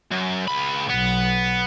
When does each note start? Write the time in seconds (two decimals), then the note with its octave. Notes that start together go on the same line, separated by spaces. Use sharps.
0.12 F#2
0.48 C#2 B5
0.89 B1 B3